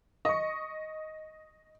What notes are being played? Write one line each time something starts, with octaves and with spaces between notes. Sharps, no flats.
D#5 C#6